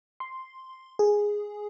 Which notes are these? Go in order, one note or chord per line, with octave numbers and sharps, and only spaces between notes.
C6
G#4